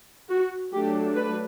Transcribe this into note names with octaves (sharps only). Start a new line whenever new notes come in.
F#4
F#3 A3 D4 G4
B4